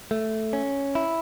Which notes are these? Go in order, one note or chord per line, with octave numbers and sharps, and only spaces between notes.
A3
C#4
E4